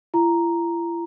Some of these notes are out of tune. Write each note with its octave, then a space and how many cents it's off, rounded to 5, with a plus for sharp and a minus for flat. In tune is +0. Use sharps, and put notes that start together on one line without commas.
E4 +45 A#5 +0